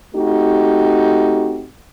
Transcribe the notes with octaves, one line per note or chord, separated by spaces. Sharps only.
A3 C4 D#4 F#4 G4